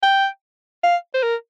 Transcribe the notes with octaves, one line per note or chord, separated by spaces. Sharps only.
G5
F5
C5
A#4